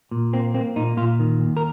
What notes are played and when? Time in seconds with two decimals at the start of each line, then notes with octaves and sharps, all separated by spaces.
0.11 A#2
0.33 A#3 C4
0.54 A#3 C4
0.76 A#2 D#4
0.97 A#2 F4
1.20 D#3
1.40 D#2
1.57 A#4